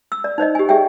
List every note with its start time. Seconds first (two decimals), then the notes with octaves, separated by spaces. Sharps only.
0.12 E6
0.24 D5
0.38 D#4 C5 D5 D#5
0.55 G4 G#5
0.69 G4 G#4 D5 E5 G5